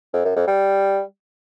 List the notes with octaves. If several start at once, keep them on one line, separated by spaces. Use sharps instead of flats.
F2
F#2
F2
G3